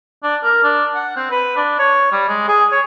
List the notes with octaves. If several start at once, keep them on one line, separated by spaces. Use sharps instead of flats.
D4
A#4
D4
F#5
C4
B4
D4
C#5
G3
G#3
G#4
C#5